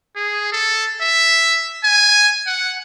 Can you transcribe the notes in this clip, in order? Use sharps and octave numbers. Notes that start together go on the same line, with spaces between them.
G#4
A4
E5
G#5
F#5